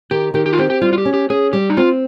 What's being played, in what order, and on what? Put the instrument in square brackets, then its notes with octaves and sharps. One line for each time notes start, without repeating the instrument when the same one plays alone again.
[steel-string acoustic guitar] D#3 [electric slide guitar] G4
[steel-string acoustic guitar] D#3 [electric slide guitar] G4
[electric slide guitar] G4
F4
[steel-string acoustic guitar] C4 [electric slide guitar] G4
[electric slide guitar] G4
[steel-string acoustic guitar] G3 [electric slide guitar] F4
[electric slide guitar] F4
G4
[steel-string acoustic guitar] C#4
[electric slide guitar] G4
[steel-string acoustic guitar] C#4 [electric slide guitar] G#4
[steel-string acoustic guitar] G3 [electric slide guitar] G4
[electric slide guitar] D#4
[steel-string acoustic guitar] C4 [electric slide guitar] F4